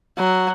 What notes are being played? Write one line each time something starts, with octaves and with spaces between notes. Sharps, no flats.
F#3